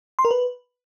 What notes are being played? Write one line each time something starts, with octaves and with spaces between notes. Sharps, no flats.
C6
A#4
B4